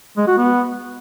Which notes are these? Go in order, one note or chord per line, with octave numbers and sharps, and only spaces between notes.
G#3
F#4
B3